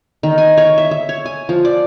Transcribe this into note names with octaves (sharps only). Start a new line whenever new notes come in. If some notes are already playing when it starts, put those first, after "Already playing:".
D#3
G#5
C#5
E5
E5
C#5
G#5
F3
D5